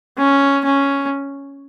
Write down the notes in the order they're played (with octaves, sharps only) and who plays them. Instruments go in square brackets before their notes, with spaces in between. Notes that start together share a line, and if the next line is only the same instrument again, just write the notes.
[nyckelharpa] C#4
C#4